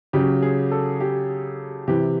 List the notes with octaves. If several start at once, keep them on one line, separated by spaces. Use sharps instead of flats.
C#3 F#3 G4
G#4
A4
G4
C3 E3 G4